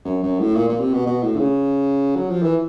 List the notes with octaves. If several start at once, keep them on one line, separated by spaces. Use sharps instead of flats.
F#2
F#2
A2
A#2
A#2
C3
B2
B2
A2
D3
C#3
F#3
F3
E3